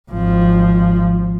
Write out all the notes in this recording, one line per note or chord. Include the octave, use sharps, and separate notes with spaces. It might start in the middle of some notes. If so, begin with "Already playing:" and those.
G#1 F3